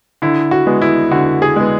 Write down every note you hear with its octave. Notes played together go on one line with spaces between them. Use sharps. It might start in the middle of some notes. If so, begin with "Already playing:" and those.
D3 E4
F#4
G#3 B3
E4
D3 F#4
G#4
G#3 B3